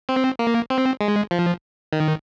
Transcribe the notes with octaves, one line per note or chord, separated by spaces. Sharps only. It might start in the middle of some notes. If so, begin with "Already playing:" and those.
C4
A#3
C4
G#3
F3
D#3